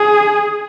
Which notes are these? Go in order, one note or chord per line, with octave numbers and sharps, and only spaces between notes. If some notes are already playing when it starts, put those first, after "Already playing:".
Already playing: G#4